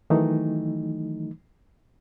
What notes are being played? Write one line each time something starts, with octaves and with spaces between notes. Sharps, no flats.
D#3 E3 F#3 A3 D#4